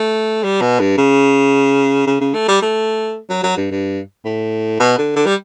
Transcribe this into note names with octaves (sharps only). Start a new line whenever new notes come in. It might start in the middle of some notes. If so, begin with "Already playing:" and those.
Already playing: A3
G3
B2
G2
C#3
C#3
C#3
A3
G3
A3
F#3
F#3
G2
G2
A2
B2
D3
D3
G3